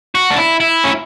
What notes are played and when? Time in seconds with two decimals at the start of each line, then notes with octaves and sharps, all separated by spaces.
0.15 F#4
0.30 D4
0.38 E4
0.60 E4
0.84 C#4